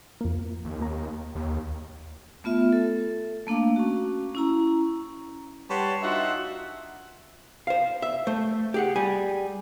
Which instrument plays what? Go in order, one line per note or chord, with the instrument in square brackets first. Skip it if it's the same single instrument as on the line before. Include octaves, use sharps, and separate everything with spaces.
[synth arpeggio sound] F2 A#3
[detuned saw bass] D#2
[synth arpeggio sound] A#3 A#5
[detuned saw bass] D#2
[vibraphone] A3 B3 F4 E5
A4
A3 A#3 D4 F5 D6
C#4 F#4
C#4 E4 A#5
[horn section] G3 B4 C#5 F#5 A5 C6
D4 D#4 F4 F#4 E5 F#5
[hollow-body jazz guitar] C5 F5
E5
A3 C5
G4 G#4 F#5
G3 G#5